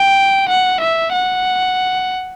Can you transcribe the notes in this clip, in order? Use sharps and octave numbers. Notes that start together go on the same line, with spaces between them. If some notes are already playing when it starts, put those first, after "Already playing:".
Already playing: G5
F#5
E5
F#5